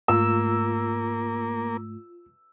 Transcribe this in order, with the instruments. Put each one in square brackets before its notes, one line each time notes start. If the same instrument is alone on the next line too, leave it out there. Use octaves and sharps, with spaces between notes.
[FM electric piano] G#2 A3 [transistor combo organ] A#3 [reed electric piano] F4 [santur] E6